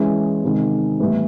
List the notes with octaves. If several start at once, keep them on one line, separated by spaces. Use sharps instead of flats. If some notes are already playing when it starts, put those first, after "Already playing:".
Already playing: E3 G#3 C#4
C3 D#3 G#3
A2 E3 G3 B3 E4